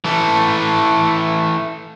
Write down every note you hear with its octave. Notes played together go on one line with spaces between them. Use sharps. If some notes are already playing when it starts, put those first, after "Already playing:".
E3 A3